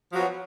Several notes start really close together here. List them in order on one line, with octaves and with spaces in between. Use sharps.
F3 F#3 B3